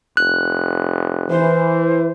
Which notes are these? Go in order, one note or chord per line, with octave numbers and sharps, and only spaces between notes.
F1 F#6
E3 C5